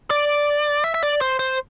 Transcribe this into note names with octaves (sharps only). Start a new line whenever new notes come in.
D5
E5
E5
D5
C5
C5